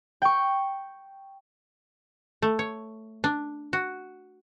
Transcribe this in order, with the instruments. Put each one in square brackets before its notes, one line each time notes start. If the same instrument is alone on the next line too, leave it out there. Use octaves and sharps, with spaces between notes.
[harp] G5 C#6
[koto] A3
C#5
D4
F#4